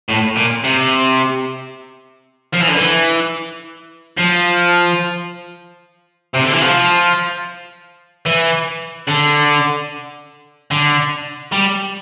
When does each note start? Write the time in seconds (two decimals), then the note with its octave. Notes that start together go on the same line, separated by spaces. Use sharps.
0.09 A2
0.36 A#2
0.64 C3
2.54 F3
2.61 E3
2.69 D3
2.76 E3
4.17 F3
6.35 C3
6.44 D3
6.53 E3
6.62 F3
8.26 E3
9.08 D3
10.71 D3
11.52 G3